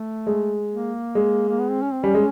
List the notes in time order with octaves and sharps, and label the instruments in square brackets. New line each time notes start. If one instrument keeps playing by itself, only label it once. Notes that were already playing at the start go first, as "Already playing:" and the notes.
Already playing: [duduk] A3
[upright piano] G#3
[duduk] A#3
[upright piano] G#3
[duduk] A#3
B3
C4
C#4
C4
[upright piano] G3 [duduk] C#4
[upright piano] G#3